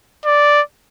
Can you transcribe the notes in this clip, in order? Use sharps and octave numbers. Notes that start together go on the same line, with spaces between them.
D5